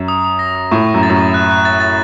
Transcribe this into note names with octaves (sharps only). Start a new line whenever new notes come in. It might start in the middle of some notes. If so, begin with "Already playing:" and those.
Already playing: F#2
D#6
D#6
A#6
D#6
A2 C#6
C#6
F#2
A6
F#2
C#6
F#6
F#6
A6
A6